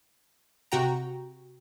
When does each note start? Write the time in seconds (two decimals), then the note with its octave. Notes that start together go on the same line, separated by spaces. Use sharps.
0.72 C3 F#4 G5 A#5